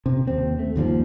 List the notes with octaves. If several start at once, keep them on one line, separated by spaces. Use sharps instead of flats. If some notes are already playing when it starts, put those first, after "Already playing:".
C3
D#2 C4
A3
G1 D#2 C3 F3